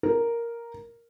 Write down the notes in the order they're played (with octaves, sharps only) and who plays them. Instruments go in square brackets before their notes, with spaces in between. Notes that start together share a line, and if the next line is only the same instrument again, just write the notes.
[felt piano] A#4